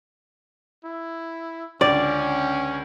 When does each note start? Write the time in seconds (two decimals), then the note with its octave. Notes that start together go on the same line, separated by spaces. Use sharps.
0.84 E4
1.81 C#2 D3 C#4 D5